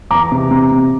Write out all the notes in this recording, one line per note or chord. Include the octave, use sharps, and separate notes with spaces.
E2 A#5 D6
C3
C3
C3